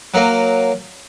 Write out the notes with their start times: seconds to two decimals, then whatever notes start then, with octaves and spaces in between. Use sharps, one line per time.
0.14 F#3 A#3